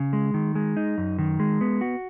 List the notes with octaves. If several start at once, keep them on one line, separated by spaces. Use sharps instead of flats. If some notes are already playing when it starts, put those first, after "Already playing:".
Already playing: C#3
G#3
D#3
G#3
D#4
F#2
D#3
G#3
B3
F#4